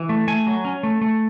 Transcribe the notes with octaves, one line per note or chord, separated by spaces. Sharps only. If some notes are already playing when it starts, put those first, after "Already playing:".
Already playing: E3
A3
A3 G#5
F#3
C#4
A3
A3